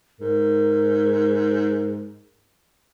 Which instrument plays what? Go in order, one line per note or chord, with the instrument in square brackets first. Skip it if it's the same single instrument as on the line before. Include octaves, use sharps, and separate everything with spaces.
[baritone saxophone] G#2 [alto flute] A#4